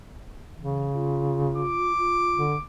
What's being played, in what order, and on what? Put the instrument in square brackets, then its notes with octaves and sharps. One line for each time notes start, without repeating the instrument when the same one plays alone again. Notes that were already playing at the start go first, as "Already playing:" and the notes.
[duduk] C#3 [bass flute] E3
[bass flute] F4
[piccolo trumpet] D6
[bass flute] F4
[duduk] D3